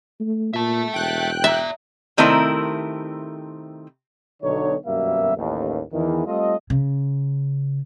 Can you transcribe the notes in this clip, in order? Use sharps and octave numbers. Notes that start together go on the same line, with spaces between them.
A3
A#2 E5 A5
E1 G5 F#6
D5 E5 A#5
C3 D#3 A3 C4 E4 A#4
B1 D3 D#4 C#5
G1 F#2 B2 G3 A#3 E5
A1 D#2
E2 D#3 E3
G3 A3 C4 F4 A4 D#5
C#3